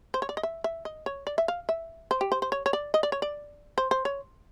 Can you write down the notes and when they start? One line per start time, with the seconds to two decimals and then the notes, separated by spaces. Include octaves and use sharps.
0.14 C5
0.22 C#5
0.29 D5
0.37 D#5
0.43 E5
0.64 E5
0.85 D#5
1.06 C#5
1.27 D5
1.38 E5
1.48 F5
1.69 E5
2.11 C5
2.21 G4
2.32 C5
2.42 C5
2.52 C#5
2.66 C#5
2.73 D5
2.94 D#5
3.03 D5
3.12 C#5
3.22 D5
3.78 C5
3.91 C5
4.05 C#5